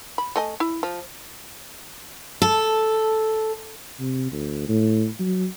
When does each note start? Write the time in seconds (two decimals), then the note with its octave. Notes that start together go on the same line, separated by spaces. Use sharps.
0.18 B5
0.36 A3 D#5 G#5
0.60 E4
0.83 F3
2.42 A4
4.00 C3
4.32 D2
4.69 A2
5.20 F#3